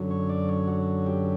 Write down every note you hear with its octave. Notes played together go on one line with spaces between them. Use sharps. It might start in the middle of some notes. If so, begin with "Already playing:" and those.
Already playing: F#2 D3 F#3
C#5
D5
C#5
F#4
G4